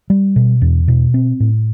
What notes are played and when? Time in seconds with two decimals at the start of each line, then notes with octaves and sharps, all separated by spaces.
0.10 G3
0.36 B2
0.62 E2
0.88 B2
1.14 C4
1.40 A2